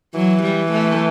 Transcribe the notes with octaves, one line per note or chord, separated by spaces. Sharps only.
E3 F#3
G3
A3